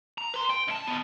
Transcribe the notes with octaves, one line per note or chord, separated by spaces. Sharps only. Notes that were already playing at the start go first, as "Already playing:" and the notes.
A#5
B4 C6
G5
C#2 A5
D#3 B3